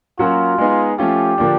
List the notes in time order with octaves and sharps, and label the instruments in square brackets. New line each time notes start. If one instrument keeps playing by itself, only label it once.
[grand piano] F#3 A#3 C#4 F#4 A#4 [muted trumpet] F4
[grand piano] G#3 B3 D#4 G#4
[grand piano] F3 A3 C#4 F4 [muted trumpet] G4
[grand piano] D3 F3 A#3 D4